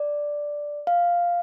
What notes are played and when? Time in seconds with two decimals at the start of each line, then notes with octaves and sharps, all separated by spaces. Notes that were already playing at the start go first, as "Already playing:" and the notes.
Already playing: D5
0.87 F5